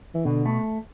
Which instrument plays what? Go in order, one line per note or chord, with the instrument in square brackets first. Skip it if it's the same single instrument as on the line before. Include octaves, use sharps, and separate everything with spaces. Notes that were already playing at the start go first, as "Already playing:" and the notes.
[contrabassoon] E3
[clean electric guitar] B2 [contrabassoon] D3
[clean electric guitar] A3